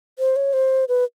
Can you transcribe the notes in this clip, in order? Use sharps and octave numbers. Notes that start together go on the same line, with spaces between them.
C5
C#5
C5
B4